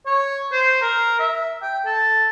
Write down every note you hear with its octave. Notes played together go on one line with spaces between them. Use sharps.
C#5
C5
A#4
E5
G5
A4